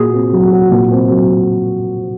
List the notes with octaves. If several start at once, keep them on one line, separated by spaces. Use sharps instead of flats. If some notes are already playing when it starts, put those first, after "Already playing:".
Already playing: A#2 F#4 G#4
C4
F#3
F#4
A#2
C4
F#3